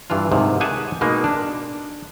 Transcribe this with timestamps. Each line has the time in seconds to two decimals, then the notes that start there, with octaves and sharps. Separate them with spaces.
0.10 G2 E3 D4 F4
0.32 G#2 C3 D#3
0.60 G4 G#4 C#5 F#5 G#5 A5
1.01 B2 G#3 A#3 D#4
1.24 D4